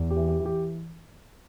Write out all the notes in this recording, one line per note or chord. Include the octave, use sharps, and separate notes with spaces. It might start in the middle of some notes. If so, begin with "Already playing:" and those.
Already playing: E2
G4
E3
G4
E3
G4